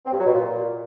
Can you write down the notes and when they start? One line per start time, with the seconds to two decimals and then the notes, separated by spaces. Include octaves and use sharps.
0.06 C4
0.13 G2
0.20 F#3
0.26 B2
0.33 A#2